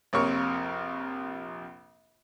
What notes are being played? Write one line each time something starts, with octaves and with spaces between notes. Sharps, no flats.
A#1 F2 C3 A#4 C#5 C#6